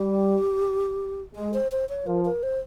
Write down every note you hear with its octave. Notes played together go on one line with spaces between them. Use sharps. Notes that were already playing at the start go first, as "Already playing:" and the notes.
Already playing: G3 G4
G#3 G#4
C5
C5
C#5
F3 A#4
A#4
C5